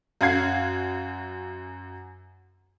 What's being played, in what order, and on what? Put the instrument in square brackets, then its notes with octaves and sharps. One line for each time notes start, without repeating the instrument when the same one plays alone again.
[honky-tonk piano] F#2 F5 F#5 G#6 C7